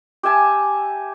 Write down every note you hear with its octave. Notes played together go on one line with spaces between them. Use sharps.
G4 E5 G#5 A5